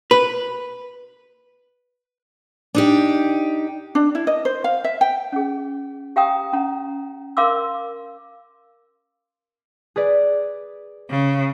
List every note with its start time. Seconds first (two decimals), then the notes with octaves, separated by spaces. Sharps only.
0.11 B4
2.74 D4 D#4 G4
3.95 D4
4.15 E4
4.27 D#5
4.45 C5
4.64 F5
4.84 E5
5.01 G5
5.32 C#4 G#4
6.16 G4 F5 G5 A#5 D#6
6.53 C#4 A#5
7.37 A#4 F5 C6 D6 E6
9.96 G#4 B4 D5
11.10 C#3